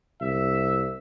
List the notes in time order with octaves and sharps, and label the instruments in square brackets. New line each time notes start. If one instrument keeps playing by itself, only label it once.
[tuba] C2 [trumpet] E5